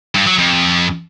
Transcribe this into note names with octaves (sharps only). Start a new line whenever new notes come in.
G2
F#3
F2